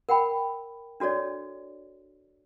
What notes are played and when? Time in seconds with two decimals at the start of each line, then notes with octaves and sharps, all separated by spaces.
0.09 A#4 F#5 G5 B5
1.00 D4 F#4 A4 C#5 D5